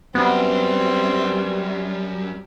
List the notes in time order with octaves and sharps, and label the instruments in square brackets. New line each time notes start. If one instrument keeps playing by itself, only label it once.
[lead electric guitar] F#2 [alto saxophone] G3 [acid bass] B3 [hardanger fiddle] C4